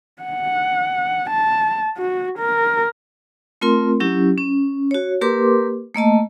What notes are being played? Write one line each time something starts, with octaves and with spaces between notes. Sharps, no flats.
F#5
A5
F#4
A#4
A3 C4 F4 A#4 C6
F#3 C#4 E4 G4
C#4
F#4 C#5
A#3 G4 A#4 B4 C6 D6
A3 A#3 D#5 A5